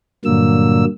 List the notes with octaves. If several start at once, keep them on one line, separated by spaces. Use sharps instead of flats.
G2 A#2 D3 F#3 A#3 E6